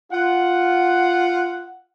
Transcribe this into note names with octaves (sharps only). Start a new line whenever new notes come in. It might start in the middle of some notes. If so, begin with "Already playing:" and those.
F4 F#5